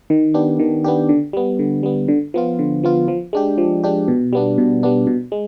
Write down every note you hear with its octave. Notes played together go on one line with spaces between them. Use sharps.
D#3
B3 D4 G4
D#3
B3 D4 G4
D3
G3 B3
D3
G3 B3
D3
F3 B3 F4
D3
F3 B3 F4
F3
G#3 D4 G4
F3
G#3 D4 G4
B2
G3 B3 D4
B2
G3 B3 D4
B2
G#3